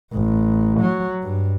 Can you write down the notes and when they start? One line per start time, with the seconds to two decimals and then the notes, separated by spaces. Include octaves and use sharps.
0.13 A1
0.80 F#3
1.22 G2